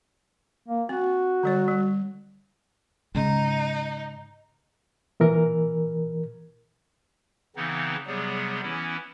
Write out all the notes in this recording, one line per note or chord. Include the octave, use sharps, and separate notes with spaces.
A#3
C4 F#4
D3 G3 C#5
G3
G#2 C#3 D#4
A#2 E3 A#4
C#3 E3 B3 C4 D#4
C3 F#3 G3 B3 G#4
E3 B3 C#4 E4